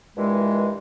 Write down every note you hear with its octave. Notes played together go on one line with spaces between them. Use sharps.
G2 A#2 E3 G#3